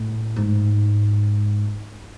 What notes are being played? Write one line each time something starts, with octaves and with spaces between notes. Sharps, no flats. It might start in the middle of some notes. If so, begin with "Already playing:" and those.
Already playing: A2
G#2